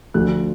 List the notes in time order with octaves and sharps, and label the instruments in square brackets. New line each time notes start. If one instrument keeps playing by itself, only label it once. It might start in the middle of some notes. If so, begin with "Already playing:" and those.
[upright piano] D2 D3 F3 F#6